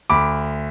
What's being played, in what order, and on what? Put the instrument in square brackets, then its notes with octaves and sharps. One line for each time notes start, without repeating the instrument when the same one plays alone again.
[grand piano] D2 B5 D6